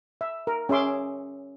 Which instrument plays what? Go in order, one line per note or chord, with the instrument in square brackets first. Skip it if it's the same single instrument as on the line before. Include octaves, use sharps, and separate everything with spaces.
[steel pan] E5
A#4
C#4 G#4 E5 C6 D6